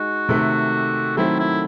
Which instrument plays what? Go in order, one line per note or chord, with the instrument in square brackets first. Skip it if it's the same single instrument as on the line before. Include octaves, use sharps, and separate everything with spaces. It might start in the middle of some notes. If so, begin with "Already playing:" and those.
Already playing: [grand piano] G#3 D#4 [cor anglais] F#4
[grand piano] C3 D#3 A3
[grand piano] D#3 F#3 A3 C4 [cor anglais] E4
[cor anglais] E4